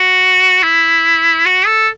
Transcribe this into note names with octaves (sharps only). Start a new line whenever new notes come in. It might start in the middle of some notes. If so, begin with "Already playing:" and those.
Already playing: F#4
E4
F#4
A4